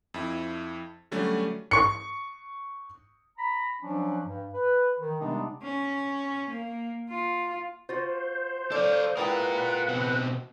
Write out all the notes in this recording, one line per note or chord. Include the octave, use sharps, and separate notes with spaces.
F2 E4
D3 F#3 G3 A3 C#4
C#6 C#7
A#5 B5
F3 F#3 C#4 D4
G2
B4
D#3
C3 G3 G#3 B3 D4 D#4
C#4
A#3
F4
F4 F#4 C5
A4 C#5 D5 F5
G#3 E4 F4 A#4 B4 F#5 G5
B2 C4